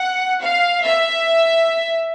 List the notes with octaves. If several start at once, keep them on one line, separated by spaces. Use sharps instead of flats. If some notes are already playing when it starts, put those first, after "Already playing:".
Already playing: F#5
F5
E5